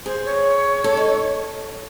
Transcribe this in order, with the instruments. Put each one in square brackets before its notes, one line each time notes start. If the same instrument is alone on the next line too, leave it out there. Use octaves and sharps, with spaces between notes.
[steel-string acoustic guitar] G#4 [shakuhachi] C5
[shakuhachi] C#5
[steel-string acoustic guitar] A4
D#4